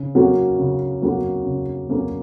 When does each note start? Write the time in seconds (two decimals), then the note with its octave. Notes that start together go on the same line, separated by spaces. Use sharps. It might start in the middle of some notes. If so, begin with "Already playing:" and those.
Already playing: C#3
0.15 F#3 A#3 C#4 F#4
0.58 C#3
1.02 F#3 A#3 C#4 F#4
1.45 C#3
1.88 F#3 A#3 C#4 F#4